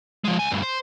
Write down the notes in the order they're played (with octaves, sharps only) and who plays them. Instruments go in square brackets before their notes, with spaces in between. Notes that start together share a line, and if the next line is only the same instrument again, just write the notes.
[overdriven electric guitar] F3 G#3
C#2 G#5
D2 G2
C5